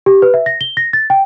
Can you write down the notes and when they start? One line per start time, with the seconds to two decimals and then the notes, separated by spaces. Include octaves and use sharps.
0.06 G4
0.22 B4
0.34 E5
0.46 A#6
0.61 G7
0.77 A#6
0.93 A6
1.10 G5